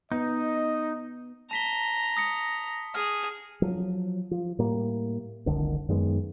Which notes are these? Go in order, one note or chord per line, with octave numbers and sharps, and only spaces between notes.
B3 D#4 D#5
A5 A#5 B6 G7
D#6 A#6 C#7
G#4 F6
F3 F#3
F3
A2 G3 A#3
F1 C2 D3 D#3
F#2 D#3 G#3 B3